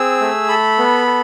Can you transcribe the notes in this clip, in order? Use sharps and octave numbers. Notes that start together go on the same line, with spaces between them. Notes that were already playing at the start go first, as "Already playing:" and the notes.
Already playing: C4 G#4 E6
A3
A4 B5
B3
A4